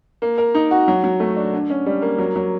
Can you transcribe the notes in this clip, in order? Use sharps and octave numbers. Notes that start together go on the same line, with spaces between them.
A#3
A#4
D#4
F#4
F#3
F#3
A3
D4
D3
C#4
G3
A#3
F#3
F#3